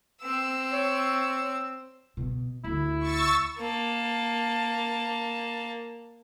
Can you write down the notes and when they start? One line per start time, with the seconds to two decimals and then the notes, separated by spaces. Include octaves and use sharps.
0.22 C4 E6
0.73 C#5
2.17 B2
2.64 D2 E4
3.00 C#6 E6 A6
3.59 A#3 A5